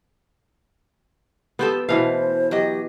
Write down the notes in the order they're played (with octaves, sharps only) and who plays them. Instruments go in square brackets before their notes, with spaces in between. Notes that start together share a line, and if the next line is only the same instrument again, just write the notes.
[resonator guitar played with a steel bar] F3 G4 A4 [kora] B3
[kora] B2 E3 F5 [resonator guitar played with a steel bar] A3 [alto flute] C5
[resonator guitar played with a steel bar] F#3 D#5 [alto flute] G4